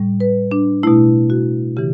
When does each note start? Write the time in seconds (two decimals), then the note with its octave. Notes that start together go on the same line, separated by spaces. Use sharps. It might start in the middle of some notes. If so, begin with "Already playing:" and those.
Already playing: A2 G3
0.20 B4
0.51 D4
0.83 B2 A3 E4
1.30 F#4
1.77 C#3 E3 G4